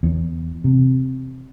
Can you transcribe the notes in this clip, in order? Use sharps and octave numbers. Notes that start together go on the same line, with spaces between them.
E2
C3